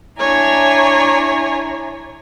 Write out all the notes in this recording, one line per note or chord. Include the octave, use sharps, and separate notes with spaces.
D4 E4 C#5 G#5 A#5